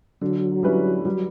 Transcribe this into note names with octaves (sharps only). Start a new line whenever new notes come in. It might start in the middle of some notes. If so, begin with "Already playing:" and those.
D3 F#3
G3 C#4 E4 B4
F#3 G3